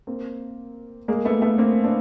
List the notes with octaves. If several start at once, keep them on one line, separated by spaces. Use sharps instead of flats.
A#3 C4
G#3 A#3
A3 B3
A3 B3
A#3 C4
C4 D4